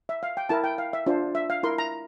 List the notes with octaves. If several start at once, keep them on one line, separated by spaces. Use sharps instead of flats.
E5
F5
G5
E4 A#4 A5
G5
F5
E5
D4 F4 C5
E5
F5
E4 A#4 C6
A#5